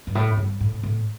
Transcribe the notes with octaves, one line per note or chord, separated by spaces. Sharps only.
G2
A2
G2
A2
A2